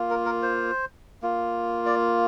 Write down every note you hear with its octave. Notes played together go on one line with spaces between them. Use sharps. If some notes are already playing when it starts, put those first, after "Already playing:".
Already playing: A#3 F4
A#4
A#4
C5
A#3 F4
D5